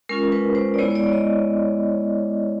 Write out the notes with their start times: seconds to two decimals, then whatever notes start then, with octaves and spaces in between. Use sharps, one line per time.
0.09 G#3 C#4 F4 A#4
0.32 B4
0.55 C5
0.74 D5
0.78 G#3 B3 E4 C#5
0.90 C#5
0.96 D5
1.07 D5
1.13 D#5